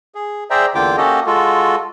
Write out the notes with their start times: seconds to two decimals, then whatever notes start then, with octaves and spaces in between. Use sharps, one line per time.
0.15 G#4
0.50 G#4 C5 D5 E5 G5 A#5
0.75 E2 D3 A#3 F4 G5 D6
0.97 A#3 C#4 F#4 G4 A4 D#5
1.27 G#3 F4 F#4 A4